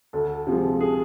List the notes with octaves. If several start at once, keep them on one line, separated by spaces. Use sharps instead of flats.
D2 A4
C3 F3 G#3
G#4